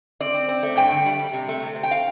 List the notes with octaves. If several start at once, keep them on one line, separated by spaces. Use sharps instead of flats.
C4 D5
C4
C4
A3
G2 G5
D3
G3
G3
C3
A3
C3
C4
G5
F5